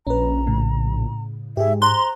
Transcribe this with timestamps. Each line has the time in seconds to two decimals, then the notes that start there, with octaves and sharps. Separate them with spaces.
0.07 A#1 C#4 B4 A#5
0.47 A2 C#3
1.57 G#2 G4 G#4 E5
1.82 C5 A#5 C6 F#6